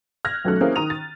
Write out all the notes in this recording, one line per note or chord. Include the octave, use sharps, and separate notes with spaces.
F6 F#6 G#6 A#6
B1 F#3 A3 C#4 A4 F#6
A#3 C4 C#4 E4 G#4
D#3 A#5 D#6 D#7 F7
A6